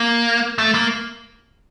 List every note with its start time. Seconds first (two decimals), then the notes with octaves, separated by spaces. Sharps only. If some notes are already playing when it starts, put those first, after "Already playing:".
Already playing: A#3
0.58 A3
0.75 A#3